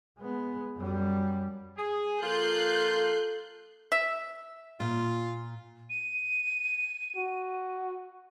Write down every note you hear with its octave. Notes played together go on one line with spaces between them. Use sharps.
G#3 B3
F#2 G3
G#4
F3 A#3 F4 A4 F#6 G6 C7
E5
A#2 F4
D#7
F#4